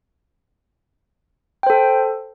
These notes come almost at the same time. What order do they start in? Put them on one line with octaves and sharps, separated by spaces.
G5 C5 A4